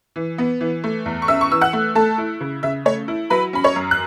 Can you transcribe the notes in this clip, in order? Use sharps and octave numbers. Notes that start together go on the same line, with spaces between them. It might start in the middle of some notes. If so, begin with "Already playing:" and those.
E3
B3
E3
A3
E2
C#6
C#4 E5 E6
C#6
E3 E6
F#5 F#6
A3
A3 A4 A5
E4
C#3
C#3 E5
A3 C#5
E4
F#3 B4 B5
C#4 B5
C#5 C#6
F#2
F#6